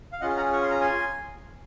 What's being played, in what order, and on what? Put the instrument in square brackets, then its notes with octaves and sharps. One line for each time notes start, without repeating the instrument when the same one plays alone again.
[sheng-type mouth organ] F5
C#4 F4 G#4 D#5 F#5
F#5 A#5
C#6
C6
A#5
G#5 C6